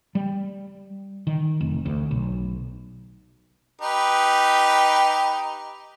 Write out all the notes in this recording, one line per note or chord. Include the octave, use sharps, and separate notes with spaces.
G3
D#3
F1
D2
B1
D#4 G4 B4